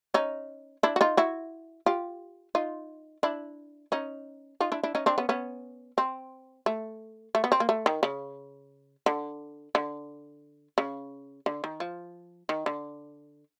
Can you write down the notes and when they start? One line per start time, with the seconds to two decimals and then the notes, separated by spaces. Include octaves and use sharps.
0.14 C#4 D#4
0.83 D4 E4
0.96 F#4
1.01 D#4 F4
1.17 E4 F#4
1.86 F4 G4
2.55 D#4 F4
3.23 D4 E4
3.92 C#4 D#4
4.60 D#4 F4
4.72 D4 E4
4.83 D4 E4
4.95 C#4 D#4
5.06 C4 D4
5.18 B3 C#4
5.29 B3 C#4
5.98 C4
6.66 A3
7.35 A3
7.44 B3
7.52 C4
7.60 A#3
7.69 A3
7.86 D#3
8.03 C#3
9.06 D3
9.75 D3
10.78 C#3
11.46 D3
11.64 D#3
11.80 F3
12.49 D#3
12.66 D3